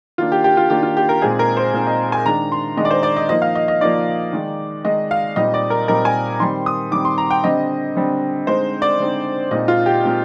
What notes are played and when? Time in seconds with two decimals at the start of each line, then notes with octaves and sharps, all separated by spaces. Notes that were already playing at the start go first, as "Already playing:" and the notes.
0.18 D#3 A#3 D4 F4
0.32 G4
0.44 G4
0.57 F4
0.70 D#3 A#3 D4 G4
0.83 F4
0.97 G4
1.09 A#4
1.22 A#2 G#3 C4 D#4 G#4
1.39 A#4
1.57 C5
1.73 A#2 G#3 C4 D#4
1.87 D#5
2.12 G#5
2.26 D#3 G#3 D4 A#5
2.52 C6
2.77 D#3 G#3 D4 D#5
2.85 D5
2.90 C5
3.03 D5
3.17 D#5
3.29 F3 A#3 D#4 D#5
3.42 F5
3.55 D#5
3.68 D#5
3.81 F3 A#3 D#4 D5
4.33 D#3 G#3 D#4
4.85 D#3 G#3 D#4 D#5
5.11 F5
5.36 A#2 G3 C4 D#4 D#5
5.54 D5
5.70 A#4
5.88 A#2 G3 C4 D#4 A#4
6.05 G#5
6.40 D#3 G3 C4 C6
6.66 D#6
6.92 D#3 G3 C4 D6
7.05 C6
7.18 A#5
7.30 G5
7.44 D3 G3 C4 D#5
7.95 D3 G3 C4
8.47 D3 G#3 C4 D#4 C5
8.82 D5
8.99 D3 G#3 C4 D#4
9.51 A#2 G#3 C4 D#4 D#5
9.68 F4
9.86 G4
10.03 A#2 G#3 C4 D#4